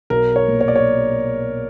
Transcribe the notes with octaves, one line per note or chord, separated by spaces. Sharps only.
B1 A#4
C#5
A#2
C#5
D5
C#5